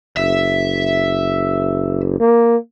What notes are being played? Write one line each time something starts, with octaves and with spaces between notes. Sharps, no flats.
F#1 E5
A#3